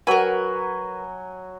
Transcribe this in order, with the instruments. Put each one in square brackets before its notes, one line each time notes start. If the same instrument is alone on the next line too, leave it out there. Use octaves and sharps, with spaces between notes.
[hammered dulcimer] F#3 G#5 [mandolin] A#4 B4